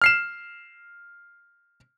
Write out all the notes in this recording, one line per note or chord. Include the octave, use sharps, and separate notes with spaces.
F6 C7 E7